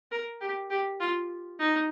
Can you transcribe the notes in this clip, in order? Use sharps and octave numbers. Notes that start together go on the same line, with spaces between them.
A#4
G4
G4
F4
D#4